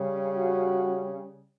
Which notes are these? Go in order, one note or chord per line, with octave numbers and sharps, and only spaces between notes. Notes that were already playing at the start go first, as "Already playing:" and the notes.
Already playing: C#3 G3 C#4
F#4